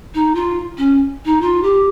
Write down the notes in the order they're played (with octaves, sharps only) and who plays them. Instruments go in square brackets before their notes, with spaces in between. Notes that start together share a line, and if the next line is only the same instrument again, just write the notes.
[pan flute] D#4
F4
C#4
D#4
F4
G4